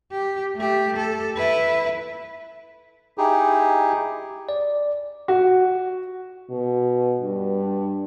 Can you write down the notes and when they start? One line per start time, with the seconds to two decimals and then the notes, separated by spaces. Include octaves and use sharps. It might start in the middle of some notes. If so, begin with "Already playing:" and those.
0.12 G4
0.56 A3 G4
0.96 A4
1.36 E4 B4
3.18 D#4 E4 G4 G#4
4.49 D5
5.28 F#4
6.50 B2
7.21 G2